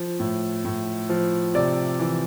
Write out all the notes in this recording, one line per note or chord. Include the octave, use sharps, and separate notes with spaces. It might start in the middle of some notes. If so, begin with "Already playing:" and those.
Already playing: F3
A2
A2
F3
C3 D5
E3